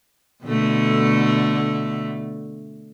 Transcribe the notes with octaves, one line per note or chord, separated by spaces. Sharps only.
B2 D3 A3